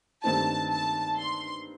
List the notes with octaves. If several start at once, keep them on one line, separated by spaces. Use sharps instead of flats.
G2 D#3 A3 C4 D#4 A5
A5
C6